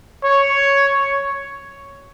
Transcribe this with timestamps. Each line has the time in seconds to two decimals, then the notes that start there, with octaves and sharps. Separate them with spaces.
0.24 C#5